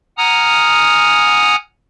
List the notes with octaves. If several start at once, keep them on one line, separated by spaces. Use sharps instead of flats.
F#5 G#5 A#5 D#6 F6